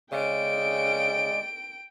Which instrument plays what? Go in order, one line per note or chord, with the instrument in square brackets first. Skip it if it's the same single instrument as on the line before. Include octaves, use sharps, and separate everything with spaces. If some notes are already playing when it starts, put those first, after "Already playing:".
[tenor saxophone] C#3 [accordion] G#3 D5 [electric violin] G5 D7